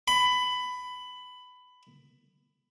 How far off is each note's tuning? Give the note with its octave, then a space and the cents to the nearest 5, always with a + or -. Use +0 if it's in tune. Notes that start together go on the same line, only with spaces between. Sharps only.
B5 +15